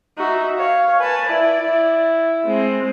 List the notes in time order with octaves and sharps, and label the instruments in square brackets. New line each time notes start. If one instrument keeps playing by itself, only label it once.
[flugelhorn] D#4 [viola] F#4 E5
[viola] C#5 [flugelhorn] F5
[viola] B4 A5 [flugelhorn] G#5
[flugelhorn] E4 [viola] D5
[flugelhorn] E4
[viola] G#3 C4